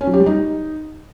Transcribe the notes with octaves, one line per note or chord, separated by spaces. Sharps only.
C#4
F#3
G4
G3
D#4